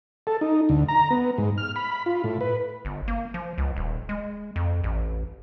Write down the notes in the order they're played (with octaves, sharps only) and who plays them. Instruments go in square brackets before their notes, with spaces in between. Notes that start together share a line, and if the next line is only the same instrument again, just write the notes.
[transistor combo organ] A4
D#4
D2
A#5
B3
G#2
F6
B5
B5
F4
A2
B4
[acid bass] G1
A#3
F3
C#2
D#1
G#3
F2
A1